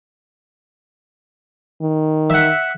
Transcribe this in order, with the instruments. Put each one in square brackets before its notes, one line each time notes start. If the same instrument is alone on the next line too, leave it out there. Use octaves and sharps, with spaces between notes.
[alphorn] D#3
[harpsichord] E5 F#5